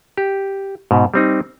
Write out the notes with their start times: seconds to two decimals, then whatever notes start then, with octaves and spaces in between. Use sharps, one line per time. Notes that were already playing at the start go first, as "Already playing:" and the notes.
0.18 G4
0.91 G#2 B2
1.14 G3 C4 D#4